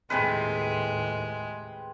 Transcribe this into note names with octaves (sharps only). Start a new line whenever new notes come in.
D#2 A2 C3 G#3 G#4 B4